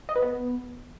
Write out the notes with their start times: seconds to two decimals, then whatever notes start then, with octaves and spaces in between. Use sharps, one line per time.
0.09 D#5
0.16 B4
0.22 B3